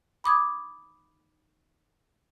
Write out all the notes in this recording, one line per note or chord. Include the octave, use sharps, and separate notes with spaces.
B5 D6 D#6 G#6